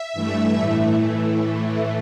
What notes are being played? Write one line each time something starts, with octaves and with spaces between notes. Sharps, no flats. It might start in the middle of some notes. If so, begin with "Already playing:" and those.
Already playing: E5
G2 E3 A3
A2 E3 A3